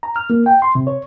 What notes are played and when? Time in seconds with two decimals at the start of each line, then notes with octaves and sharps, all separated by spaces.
0.03 A#5
0.16 F6
0.30 A#3
0.46 G5
0.62 C6
0.75 C3
0.87 C#5